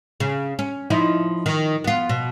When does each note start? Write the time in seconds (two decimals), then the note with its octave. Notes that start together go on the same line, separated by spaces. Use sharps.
0.20 C#3
0.59 C#4
0.90 F3 D#4 E4
1.46 D#3
1.84 B3 F4
2.09 B2